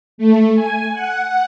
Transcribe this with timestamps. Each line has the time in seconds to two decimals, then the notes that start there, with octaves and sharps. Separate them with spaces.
0.18 A3
0.55 G#5
0.92 F#5